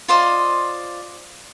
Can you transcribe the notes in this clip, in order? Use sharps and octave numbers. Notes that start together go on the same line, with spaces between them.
F4 C5 D5 D#5